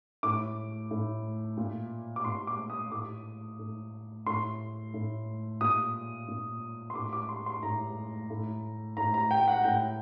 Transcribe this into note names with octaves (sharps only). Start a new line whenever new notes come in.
A2 D6
A2
A#2
D6
A#2 C6
D6
D#6
A2 D6
A2
A2 C6
A2
A#2 D#6
A#2
C6
A2 D6
D6
C6
C6
A2 A#5
A2
A2 A#5
A#5
G5
F#5
A2 G5